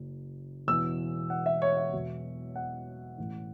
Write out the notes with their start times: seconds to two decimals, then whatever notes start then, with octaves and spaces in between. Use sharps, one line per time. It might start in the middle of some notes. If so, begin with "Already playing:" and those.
Already playing: F#1 F#2 F#3
0.67 E1 E2 E3 E6
1.30 F#5
1.46 E5
1.62 C#5
1.77 E5
1.93 E1 E2 B2 F#3
2.56 F#5
3.18 A1 A2 E3